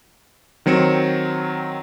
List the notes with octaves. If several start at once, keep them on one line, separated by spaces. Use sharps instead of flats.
D#3 F#3 C4 C#7 E7